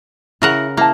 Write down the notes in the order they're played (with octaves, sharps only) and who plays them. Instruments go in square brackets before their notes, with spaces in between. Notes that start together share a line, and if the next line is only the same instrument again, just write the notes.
[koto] C#3 A#4 F#5 [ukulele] E4
[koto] A#3 [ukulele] E4 A5